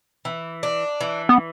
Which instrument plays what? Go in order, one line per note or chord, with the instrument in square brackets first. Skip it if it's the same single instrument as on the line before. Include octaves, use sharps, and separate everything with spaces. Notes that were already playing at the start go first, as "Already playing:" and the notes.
[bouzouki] E3
D4
E3
[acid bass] B3